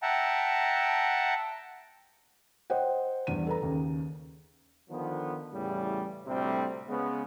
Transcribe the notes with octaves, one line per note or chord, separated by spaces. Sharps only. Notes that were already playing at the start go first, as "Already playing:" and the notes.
E5 F#5 G5 A5 A#5
C5 D#5 F#5 G5
E2 G2 D#7
A4 B4 A#5
D#2 C#3
D3 D#3 F3 B3
E2 A2 C#3 G3
D2 A2 C3 G3 C4
C#3 G#3 B3